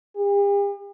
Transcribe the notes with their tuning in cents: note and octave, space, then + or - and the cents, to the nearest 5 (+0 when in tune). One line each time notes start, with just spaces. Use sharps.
G4 +45